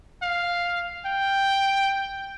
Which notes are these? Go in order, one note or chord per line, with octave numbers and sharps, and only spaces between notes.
F5
G5